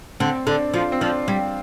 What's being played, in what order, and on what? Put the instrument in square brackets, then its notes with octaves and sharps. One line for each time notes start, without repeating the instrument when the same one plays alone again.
[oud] D3 [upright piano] C4
[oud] D3 [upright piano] D4
[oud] F3 [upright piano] F4
[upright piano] C4
[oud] F3 [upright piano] D4
[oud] G3